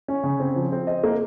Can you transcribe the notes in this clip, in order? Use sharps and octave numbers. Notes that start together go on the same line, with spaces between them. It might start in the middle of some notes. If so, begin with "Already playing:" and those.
C#4
C#3
C4
F3
C4
D#5
A#3